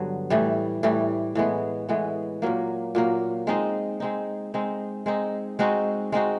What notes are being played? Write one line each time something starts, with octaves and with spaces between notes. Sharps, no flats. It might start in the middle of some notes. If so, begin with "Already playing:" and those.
Already playing: G2 D3 F#3 B3
A2 E3 G3
A2 E3 G3
A2 E3 G#3 B3
A2 E3 G#3 B3
A#2 F#3 A#3
A#2 F#3 A#3
G#3 C4 D#4
G#3 C4 D#4
G#3 C4 D#4
G#3 C4 D#4
G#3 C4 D#4 F#4
G#3 C4 D#4 F#4